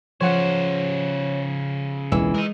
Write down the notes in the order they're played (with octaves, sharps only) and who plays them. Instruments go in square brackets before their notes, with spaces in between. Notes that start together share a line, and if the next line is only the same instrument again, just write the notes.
[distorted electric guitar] C#3 C5 [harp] F3 F#5 F#6 [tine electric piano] C#5
[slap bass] E1 C#2 [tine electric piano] E3 E6
[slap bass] G#3 [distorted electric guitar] A#4 D#5